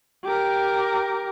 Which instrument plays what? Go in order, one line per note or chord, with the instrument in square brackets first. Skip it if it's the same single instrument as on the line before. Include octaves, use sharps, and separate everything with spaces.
[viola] G4 A#4